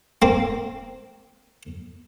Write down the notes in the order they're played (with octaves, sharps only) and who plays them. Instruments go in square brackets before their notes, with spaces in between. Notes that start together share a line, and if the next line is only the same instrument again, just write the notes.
[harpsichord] A#3 C4